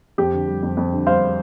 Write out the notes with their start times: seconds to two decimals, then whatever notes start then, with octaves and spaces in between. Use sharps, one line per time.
0.18 F2 G4
0.33 D3
0.48 G3
0.63 F2
0.77 F2
0.92 D3
1.06 G3 C5 F5